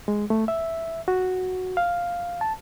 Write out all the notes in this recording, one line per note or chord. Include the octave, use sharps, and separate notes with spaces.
G#3
A3
E5
F#4
F5
A5